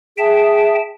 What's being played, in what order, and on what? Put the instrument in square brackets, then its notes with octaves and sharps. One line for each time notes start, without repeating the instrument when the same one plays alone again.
[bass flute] G#4 [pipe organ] E5 G5 A5